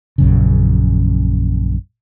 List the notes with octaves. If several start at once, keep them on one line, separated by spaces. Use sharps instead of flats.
A#1 F#2 C#3